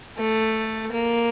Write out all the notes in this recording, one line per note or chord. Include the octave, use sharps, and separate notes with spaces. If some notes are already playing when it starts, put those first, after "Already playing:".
A3
A#3